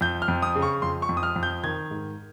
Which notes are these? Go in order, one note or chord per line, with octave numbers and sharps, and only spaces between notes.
F2 G6
F6
F2
D#6
C#3
C#6
F2 C6
C#6
F2
D#6
F6
F2
G6
D#3 G#6
G#2